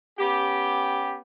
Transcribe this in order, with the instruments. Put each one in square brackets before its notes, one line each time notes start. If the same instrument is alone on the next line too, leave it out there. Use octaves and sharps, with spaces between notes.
[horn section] B3 C#4 G4